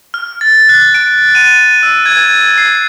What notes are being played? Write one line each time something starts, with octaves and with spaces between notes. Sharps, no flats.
F6
A6
F#6
D7
D#7
E6
G#6
C7